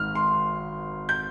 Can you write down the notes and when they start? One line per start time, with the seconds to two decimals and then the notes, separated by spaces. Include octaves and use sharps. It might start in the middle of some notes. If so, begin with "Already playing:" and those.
Already playing: G#1 G#2 D#3 F6
0.15 C6
1.09 G6